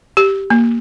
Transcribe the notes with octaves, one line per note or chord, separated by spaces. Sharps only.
G4
A#3